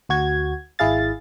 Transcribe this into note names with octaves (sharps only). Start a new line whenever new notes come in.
D2 F#4 G#6
G#1 E4 G#4 F5 A6